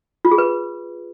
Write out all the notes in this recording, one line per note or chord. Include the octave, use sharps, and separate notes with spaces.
F4
G#4
B4